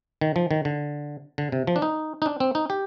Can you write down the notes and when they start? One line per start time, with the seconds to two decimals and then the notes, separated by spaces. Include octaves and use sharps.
0.21 D#3
0.36 F3
0.51 D#3
0.65 D3
1.38 D3
1.52 C3
1.67 F3
1.76 D4
1.82 D#4
2.22 D#4
2.26 D4
2.40 C4
2.55 D#4
2.70 G4